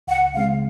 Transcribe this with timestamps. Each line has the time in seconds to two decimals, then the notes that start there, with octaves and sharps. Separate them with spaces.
0.07 C#2 F#5
0.34 C#3 G#3 C4 F5